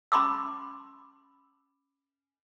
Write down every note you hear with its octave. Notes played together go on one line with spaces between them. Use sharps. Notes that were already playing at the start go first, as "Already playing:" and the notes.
C#4 B5 C6 D6 E6